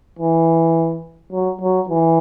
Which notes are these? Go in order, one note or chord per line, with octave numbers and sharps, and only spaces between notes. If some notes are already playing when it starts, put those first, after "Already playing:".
E3
F#3
F#3
E3